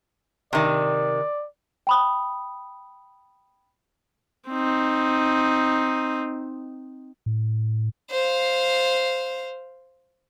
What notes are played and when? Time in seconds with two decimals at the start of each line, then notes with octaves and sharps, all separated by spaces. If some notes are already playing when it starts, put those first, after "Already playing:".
0.53 C3 D#3 D5
1.87 G5 B5 D#6
4.49 C4 D#4
7.26 A2
8.10 C5 F5